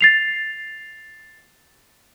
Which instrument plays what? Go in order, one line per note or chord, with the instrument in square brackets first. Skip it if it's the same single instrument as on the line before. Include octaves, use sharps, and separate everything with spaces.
[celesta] A6 C7 F7